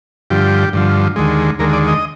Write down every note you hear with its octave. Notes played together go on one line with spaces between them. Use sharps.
G2 D3 F3 G4
G2 D3 F3
D#2 D3 G#3
D#2 D3 G#3 A#4
D5
D#5